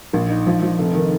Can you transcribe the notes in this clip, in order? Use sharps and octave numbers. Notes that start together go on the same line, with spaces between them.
A#1
D#4
F3
F3
F1
D#3